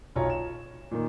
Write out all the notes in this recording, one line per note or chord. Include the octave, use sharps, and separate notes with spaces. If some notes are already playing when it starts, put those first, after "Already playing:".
B1 F4 C#5 A#5
E7
A#2 D#3